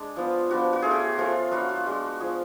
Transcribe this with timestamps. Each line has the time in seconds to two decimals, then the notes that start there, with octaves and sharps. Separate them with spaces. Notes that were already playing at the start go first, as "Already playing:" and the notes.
Already playing: G#3 D4
0.16 F3 B3 F4
0.49 F3 B3 D4 F#4
0.73 F#4
0.82 A3 C#4 F4 G#4
0.91 F#4
1.18 F3 A3 C#4 F4
1.51 F#3 B3 D4 F4 F#4
1.69 F#4
1.86 G#3 D4 F4 F#4
2.20 F3 B3 F4 G#4